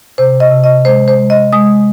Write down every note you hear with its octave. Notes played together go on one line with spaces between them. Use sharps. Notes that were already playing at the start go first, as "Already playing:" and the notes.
C3 C5
D#5
C3
D#5
G#3 C5
C5
G#3
D#5
G#3 D#6